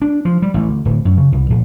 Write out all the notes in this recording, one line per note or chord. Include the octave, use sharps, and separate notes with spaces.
D4
F3
G3
A1
D2
D1
F#2
C#3
C2
A#1